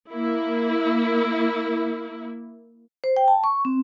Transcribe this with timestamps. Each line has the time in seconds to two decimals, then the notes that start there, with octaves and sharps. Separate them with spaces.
0.11 A#3 E4
3.04 C5
3.16 G5
3.28 A5
3.44 C#6
3.65 C4